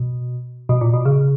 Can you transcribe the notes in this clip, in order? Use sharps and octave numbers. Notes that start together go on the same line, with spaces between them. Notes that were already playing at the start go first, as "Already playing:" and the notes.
Already playing: B2
B2
A#2
B2
C#3